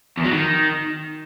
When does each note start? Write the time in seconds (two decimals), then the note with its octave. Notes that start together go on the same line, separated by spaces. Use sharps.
0.18 E2
0.25 F#3
0.32 D#3